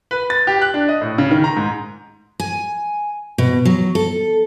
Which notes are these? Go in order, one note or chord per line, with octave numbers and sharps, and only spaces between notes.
B4
A6
G4
F#6
D4
D#5
A2
C#3
D#3
A#5
G#2
G#5
B2
F#3
A4